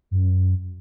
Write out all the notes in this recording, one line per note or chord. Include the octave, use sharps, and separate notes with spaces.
F#2